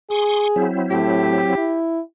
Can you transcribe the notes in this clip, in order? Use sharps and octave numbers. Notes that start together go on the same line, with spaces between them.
G#4 C6 C#6 D#6
F#3 C4 E4
A2 G4
E4